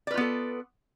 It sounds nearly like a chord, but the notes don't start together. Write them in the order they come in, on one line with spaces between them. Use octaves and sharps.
D5 B4 F4 B3 A4